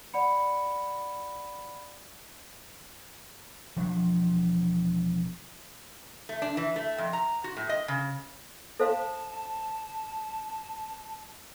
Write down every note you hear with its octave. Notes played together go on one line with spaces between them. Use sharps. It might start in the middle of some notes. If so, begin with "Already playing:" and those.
D5 F#5 B5 C#7
E1 F3 D4
A3
D4
E3
A3
F2
A#5
F#4
A2
D#5
C#3
A4 C5 F5 A5